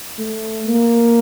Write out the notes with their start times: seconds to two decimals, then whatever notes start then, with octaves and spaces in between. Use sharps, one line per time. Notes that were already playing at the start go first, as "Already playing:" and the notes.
0.19 A3
0.67 A#3